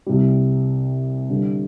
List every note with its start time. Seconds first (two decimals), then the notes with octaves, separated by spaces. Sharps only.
0.06 C2 C3 G3
1.29 G2 D3 G3